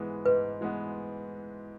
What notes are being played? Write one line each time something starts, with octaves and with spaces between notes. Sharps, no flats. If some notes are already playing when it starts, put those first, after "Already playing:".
Already playing: G#2 E3 G#3 B3
G#2 B4
E3 G#3 B3